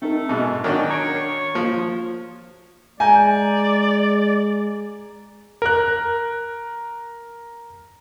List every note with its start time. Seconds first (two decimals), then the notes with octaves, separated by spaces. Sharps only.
0.02 A3 C4 D#4 A#4
0.29 G#2 B2 A5 E6
0.64 D#3 F#3 C#4 D4
0.90 C#5 A#5 D7
1.16 C7
1.55 F3 A#3
3.00 G#3 D5 G#5 A#5 G6
5.62 A#4 F#6